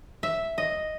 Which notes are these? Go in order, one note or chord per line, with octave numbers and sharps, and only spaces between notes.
E5
D#5